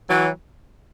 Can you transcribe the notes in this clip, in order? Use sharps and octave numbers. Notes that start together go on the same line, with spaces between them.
E3 F#3